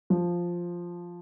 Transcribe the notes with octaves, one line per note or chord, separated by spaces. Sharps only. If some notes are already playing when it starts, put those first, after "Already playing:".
F3